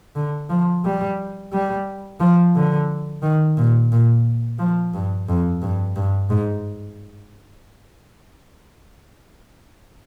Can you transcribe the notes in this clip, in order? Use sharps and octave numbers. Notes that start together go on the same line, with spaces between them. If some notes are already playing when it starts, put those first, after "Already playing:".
D3
F3
G3
G3
F3
D3
D#3
A#2
A#2
F3
G2
F2
G2
G2
G#2